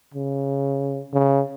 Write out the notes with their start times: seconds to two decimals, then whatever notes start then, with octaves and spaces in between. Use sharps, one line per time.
0.14 C#3
1.13 C#3